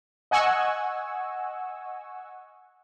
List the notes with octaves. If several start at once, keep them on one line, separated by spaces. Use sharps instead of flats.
D#5 F#5 G#5 C#6 E6